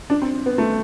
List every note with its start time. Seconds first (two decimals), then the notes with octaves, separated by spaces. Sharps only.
0.10 D4
0.22 C4
0.46 B3
0.58 A3